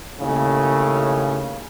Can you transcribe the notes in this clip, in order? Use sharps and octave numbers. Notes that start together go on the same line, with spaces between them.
D#2 A2 C#3